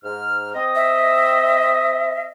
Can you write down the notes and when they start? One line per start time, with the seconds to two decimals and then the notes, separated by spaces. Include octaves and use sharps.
0.02 G#2 F6
0.54 C4 D#5
0.75 E5